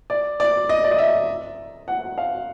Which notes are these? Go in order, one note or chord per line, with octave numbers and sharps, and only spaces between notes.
D5
D5
D#5
D5
D#5
E5
F#5
F5